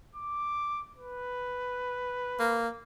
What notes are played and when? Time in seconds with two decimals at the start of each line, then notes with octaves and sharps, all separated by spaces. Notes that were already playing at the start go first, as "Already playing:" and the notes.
0.15 D6
0.97 B4
2.40 A#3